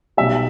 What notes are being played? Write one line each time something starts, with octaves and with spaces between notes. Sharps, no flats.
B1 B2 G3 E5